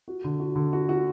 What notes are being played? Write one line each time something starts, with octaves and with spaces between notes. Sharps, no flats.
F#4
D3
F#4
D3
F#4
F#4